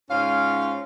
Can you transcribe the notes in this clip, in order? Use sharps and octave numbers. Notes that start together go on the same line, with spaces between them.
G#2 C#4 F4 F5